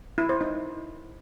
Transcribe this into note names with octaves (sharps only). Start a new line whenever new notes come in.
E4
C5
D#4